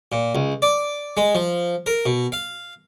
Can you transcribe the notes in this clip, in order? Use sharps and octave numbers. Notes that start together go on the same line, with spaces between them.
A#2
C#2
D5
G#3
F3
A#4
B2
F5